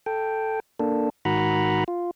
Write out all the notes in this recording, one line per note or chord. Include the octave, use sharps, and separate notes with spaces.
A4 G5
A#3 D4 A4
G#2 D#3 F#4 F#5 A#5 B5
F4